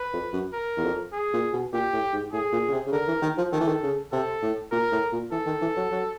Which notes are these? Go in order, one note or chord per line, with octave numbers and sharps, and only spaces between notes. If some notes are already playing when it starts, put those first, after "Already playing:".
Already playing: B4
F2
F#2
A#4
E2
F2
G#4
A#2
B2
A#2 G4
A2
G#2
A2 G#4
A#2
C#3
C3
C#3
D3 A#4
E3
D#3
F3
D#3 A4
E3
D#3
C#3
C3 A4
A2
A#2 A#4
A2
A#2
E3 A4
D#3
E3
F#3
F#3